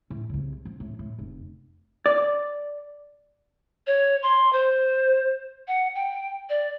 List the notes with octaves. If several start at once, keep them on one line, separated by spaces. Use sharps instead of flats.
A2
C2 C#3
F3
A2
A2
F1
D5
C#5
C6
C5
F#5
G5
D5